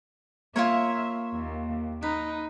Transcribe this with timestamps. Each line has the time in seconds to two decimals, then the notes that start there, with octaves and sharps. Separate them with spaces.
0.56 A#3 F4 A#4 C#5 E5
1.33 D#2
2.03 D#4 B4